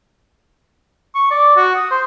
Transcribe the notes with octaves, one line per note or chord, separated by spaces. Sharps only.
C#6
D5
F#4
D#6
C5